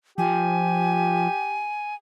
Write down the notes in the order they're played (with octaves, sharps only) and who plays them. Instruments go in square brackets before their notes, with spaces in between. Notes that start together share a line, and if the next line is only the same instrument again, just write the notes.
[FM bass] F3 [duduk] G4 [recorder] G#5